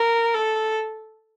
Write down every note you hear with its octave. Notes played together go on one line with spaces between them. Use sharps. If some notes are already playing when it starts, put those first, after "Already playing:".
Already playing: A#4
A4